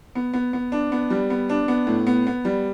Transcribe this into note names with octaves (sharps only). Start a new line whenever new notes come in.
B3
B3
B3
D4
B3
G3
B3
D4
B3
A2
B3
B3
G3